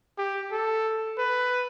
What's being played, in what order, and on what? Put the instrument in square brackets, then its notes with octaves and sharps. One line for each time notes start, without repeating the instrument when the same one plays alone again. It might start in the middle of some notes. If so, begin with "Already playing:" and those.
[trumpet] G4
A4
B4